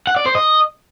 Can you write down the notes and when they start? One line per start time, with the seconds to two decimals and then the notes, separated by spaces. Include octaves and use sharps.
0.07 F#5
0.16 D5
0.26 C5
0.35 D#5